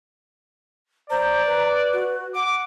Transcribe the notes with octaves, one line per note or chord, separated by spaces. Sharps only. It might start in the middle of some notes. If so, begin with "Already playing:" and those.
C5 D5 A#5
B4
F#4
F#5 D6